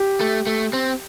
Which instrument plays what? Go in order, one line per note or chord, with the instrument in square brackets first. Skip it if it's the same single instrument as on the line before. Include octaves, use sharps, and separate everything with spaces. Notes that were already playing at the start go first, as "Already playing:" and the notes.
Already playing: [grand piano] G4
[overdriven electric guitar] A3
A3
C4